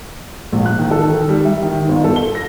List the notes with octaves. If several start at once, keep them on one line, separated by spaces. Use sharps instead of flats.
A#1
F#6
D#3
A4
D#3
G3
E5
D#3
G1
A4
G7
A#6